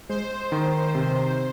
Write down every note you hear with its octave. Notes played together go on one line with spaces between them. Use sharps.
G#3 C5
D#3
C3